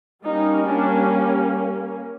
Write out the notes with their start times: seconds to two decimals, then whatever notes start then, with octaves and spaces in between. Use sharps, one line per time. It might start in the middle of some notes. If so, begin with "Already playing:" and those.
0.24 G3 A#3 C#4 D#4
0.67 D4